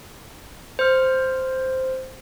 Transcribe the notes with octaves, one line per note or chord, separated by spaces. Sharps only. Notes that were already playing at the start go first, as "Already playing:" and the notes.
C5 F6